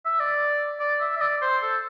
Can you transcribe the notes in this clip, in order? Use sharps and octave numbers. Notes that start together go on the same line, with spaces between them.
E5
D5
D5
E5
E5
D5
C5
A4